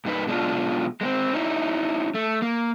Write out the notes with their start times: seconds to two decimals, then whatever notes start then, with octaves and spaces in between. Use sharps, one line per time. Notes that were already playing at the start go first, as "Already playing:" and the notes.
0.05 G2 A#3 D#4 B4
0.27 B2 G#3 A#3 D4 F4
1.01 G#3 A#3 C4
1.33 C#4 D#4 E4
2.14 A3
2.42 A#3